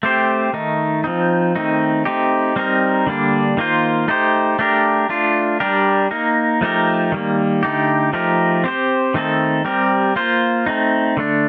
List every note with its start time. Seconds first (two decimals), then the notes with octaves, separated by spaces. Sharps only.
0.03 A3 C4 G4 C5
0.53 D#3 A3 D#4
1.04 F3 C4 D#4
1.56 D#3 A3 C4 D#4
2.05 A3 C4 D#4 G4
2.56 G3 C4 D#4 A#4
3.07 D3 G3 A#3 D4
3.57 D#3 A#3 F4 C5
4.08 A3 D#4 G4 C5
4.59 A3 D4 G4 A#4
5.09 A3 D4 F4
5.60 G3 D4 G4 A#4
6.11 A#3 D#4 A#4
6.61 F3 A3 D#4 G4 A#4
7.12 D#3 G3 A#3
7.63 D3 A3 D#4 G4
8.13 F3 A3 D#4 G4 A#4
8.64 C4 G4 C5
9.14 D#3 A3 C4 D#4 A4
9.65 G3 C4 G4 A#4
10.16 A#3 F4 C5
10.66 A3 C4 D#4
11.17 D3 A3 D4